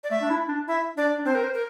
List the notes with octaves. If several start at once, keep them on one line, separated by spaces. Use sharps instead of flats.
D5
A3 E5
D4
E4
D4
E4 E5
D4 D5
D4
C4 C5
A#4
C5
A#4